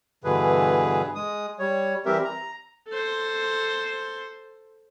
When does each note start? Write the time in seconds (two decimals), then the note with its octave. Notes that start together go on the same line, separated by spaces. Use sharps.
0.24 G2 B2 D3 E3 G#4 B4
1.15 G#3 D#6
1.59 G3 C#5
2.06 E3 G3 C4 G4 A#4 E5
2.25 A#5
2.88 A4 C5